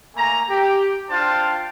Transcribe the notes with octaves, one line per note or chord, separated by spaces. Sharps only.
A3 A#3 G#5 A#5
G4
D4 F4 C5 F5 G5 A5